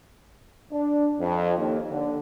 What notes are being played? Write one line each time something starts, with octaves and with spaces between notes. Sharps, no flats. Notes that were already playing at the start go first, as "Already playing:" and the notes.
D4
F2
D#2
D3